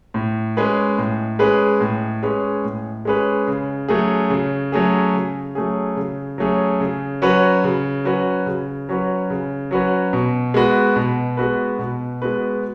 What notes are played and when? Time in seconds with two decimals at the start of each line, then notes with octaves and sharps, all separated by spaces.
0.14 A2
0.57 G#3 C#4 G#4 B4
0.98 A2
1.39 G#3 C#4 G#4 B4
1.80 A2
2.23 G#3 C#4 G#4 B4
2.64 A2
3.05 G#3 C#4 G#4 B4
3.47 C#3
3.88 F#3 A3 C#4 G#4
4.30 C#3
4.72 F#3 A3 C#4 G#4
5.14 C#3
5.55 F#3 A3 C#4 G#4
5.97 C#3
6.38 F#3 A3 C#4 G#4
6.80 C#3
7.22 F#3 C#4 F#4 B4
7.64 C#3
8.04 F#3 C#4 F#4 B4
8.46 C#3
8.89 F#3 C#4 F#4 B4
9.30 C#3
9.71 F#3 C#4 F#4 B4
10.13 B2
10.54 G#3 B3 F#4 B4
10.96 B2
11.37 G#3 B3 F#4 B4
11.79 B2
12.22 G#3 B3 F#4 B4